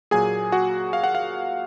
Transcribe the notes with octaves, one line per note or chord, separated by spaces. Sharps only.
A#2 F#3 A#3 G#4 G#5
F#4 F#5
F5
F#5
F5